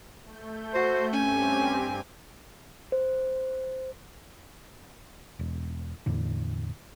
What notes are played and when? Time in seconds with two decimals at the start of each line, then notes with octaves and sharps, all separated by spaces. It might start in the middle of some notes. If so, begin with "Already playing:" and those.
0.23 A3 G6
0.74 F#4 C5
1.13 G2 C4 C#4 G4 G#5
2.92 C5
5.39 E1
6.06 E2 A2 D3